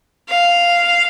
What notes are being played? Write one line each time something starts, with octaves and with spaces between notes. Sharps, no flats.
F5